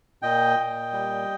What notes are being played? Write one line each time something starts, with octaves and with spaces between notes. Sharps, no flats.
A#2 D#5 G5
A#2
G3